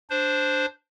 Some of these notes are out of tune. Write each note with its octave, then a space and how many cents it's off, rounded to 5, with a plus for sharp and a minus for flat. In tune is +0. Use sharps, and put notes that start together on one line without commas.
D4 +0 C5 +0